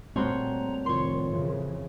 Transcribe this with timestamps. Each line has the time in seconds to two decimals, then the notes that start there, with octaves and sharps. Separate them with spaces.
0.16 A#2 G3 A3 C4 F#4 C5 C#5 A#5
0.86 F1 A2 D#3 F4 C#5 C6
1.29 F2 C#3 E3